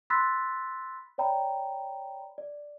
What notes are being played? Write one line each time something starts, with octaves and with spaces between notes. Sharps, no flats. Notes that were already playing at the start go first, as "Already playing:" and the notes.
B5 C6 E6 F#6 A6 B6
C#5 D5 G5 A#5 B5
D5